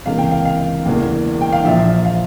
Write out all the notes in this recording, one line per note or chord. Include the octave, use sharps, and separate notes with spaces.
C#2 C3 E3 A#3 C#4 F5
G5
F5
F5
E1 E2 C#3 E3 A#3
G5
F5
A#1 A#2 F3 E5
F5